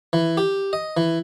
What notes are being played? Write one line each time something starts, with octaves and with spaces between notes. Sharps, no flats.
E3
G4
D#5
E3